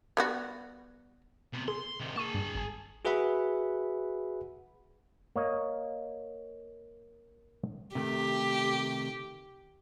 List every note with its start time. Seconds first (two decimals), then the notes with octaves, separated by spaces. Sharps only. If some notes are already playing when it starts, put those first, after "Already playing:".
0.17 G3 B3 F#4
1.53 C3 B3
1.68 G#4 C6
2.00 C3 D#3
2.16 A#3 G#4 A5 C#6 D#7
2.34 G2
2.55 G#1 G#5
3.05 F#4 G#4 B4 E5 F#5 B5
5.36 A#3 C#5 D#5
7.95 C3 D#3 A3 G4